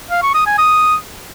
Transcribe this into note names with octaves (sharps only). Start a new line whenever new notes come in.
F5
C#6
D#6
G#5
D#6